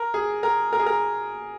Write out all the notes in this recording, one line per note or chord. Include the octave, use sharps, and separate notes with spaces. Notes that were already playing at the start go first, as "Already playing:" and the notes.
Already playing: A#4
G#4
A#4
A#4
G#4
A#4